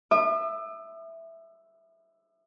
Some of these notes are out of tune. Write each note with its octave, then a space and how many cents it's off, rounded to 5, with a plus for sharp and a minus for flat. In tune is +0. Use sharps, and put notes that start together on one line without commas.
E5 +0 D#6 -45